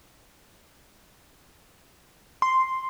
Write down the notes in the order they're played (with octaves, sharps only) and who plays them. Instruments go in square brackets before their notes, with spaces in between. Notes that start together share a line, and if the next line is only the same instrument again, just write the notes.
[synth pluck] C6